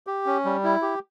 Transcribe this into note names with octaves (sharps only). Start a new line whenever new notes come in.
G4
C#4
G3
E4
G4